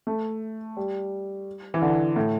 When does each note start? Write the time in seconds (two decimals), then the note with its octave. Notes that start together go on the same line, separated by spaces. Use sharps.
0.07 A3
0.77 G3
1.74 E3
1.82 D3
2.16 A2